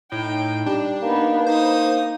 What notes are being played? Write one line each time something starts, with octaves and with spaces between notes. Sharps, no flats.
A2 D#4 G5
G3 D4
A#3 B3 D#4
D#4 C5 D#6